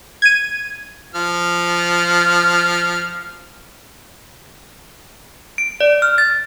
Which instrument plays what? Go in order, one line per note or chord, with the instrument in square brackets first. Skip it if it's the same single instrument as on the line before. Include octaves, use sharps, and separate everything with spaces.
[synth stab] G#6 D#7
[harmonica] F3 F6
[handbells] D7
D5
F6
A6